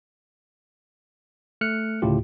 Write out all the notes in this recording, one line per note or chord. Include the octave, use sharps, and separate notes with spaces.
A3 F6 F#6 C#7
D2 A2 C#3 E4 F4 G4